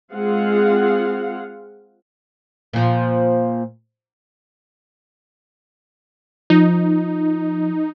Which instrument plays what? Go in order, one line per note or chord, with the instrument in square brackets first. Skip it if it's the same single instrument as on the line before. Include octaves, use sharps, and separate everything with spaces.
[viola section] G#3 C4 F4 G#4 F5 F#5
[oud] A#2 F3
[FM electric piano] F3 [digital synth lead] D#4